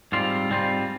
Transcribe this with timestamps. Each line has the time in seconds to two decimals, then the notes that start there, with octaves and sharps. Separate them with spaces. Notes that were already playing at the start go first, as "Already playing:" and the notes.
0.12 G#2 G3 C4 F4
0.49 G#2 G3 C4 F4